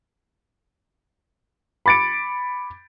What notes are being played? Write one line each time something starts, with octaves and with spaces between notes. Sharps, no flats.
B5 D6 A6 C#7 D7